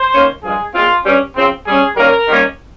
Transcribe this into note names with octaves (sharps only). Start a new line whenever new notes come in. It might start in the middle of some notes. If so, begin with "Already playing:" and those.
Already playing: C5
D#3 A#3 C#4
G2 F3 G#3 G#4
A#2 G#3 C4 F4
G2 G3 C#4
C#3 F3 C4
C3 G3 C#4 G#4
D#3 G3 A#3 C#4 A#4
C3 D#3 G3 A#3 C#4